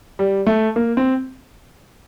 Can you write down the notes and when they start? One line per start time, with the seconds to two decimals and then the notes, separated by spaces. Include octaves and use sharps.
0.19 G3
0.47 A3
0.76 A#3
0.97 C4